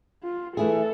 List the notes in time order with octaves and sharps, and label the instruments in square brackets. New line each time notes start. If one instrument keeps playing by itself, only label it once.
[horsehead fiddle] F4
[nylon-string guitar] E3 A3 E4 G#4 [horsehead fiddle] A4